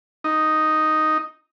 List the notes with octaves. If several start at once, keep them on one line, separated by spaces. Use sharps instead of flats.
D#4